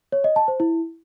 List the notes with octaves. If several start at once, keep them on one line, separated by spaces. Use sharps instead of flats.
C#5
D#5
A5
C5
E4